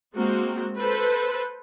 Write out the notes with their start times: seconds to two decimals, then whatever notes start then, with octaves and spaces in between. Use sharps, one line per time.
0.14 G#3 A#3 C4 F#4
0.78 A4 B4 C5